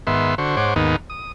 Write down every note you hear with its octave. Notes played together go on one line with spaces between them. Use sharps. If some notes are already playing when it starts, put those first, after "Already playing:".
G#2 D#3 B3 E5 C6
D3 F#4 C5 C#6
G#2 C5 C#5 F#5 D6
D#2 G#2 D#3 B3 D#4
D#6